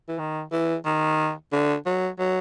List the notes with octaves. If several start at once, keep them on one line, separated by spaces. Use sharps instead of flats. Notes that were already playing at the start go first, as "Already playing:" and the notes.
E3
D#3
E3
D#3
D3
F#3
F#3